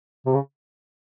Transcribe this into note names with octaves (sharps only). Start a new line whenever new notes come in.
C3
C#3